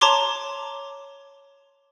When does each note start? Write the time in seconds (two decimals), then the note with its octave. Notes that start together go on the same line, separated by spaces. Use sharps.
0.01 C#5 A5 A#5 C6 D6 G7